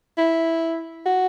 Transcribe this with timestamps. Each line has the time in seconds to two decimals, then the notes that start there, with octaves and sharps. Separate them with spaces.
0.18 E4
1.06 F#4